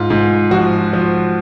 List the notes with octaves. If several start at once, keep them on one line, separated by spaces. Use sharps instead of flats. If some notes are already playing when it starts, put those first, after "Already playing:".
Already playing: G#2 F4
G#2
F3 F#4
F3